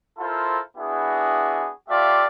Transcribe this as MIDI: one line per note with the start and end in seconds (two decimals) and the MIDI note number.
0.19 0.59 64
0.19 0.59 65
0.19 0.59 69
0.19 0.59 70
0.19 0.59 72
0.77 1.70 59
0.77 1.70 62
0.77 1.70 64
0.77 1.70 66
0.77 1.70 68
1.89 2.26 57
1.89 2.26 65
1.89 2.26 67
1.89 2.26 74
1.89 2.26 76
1.89 2.26 77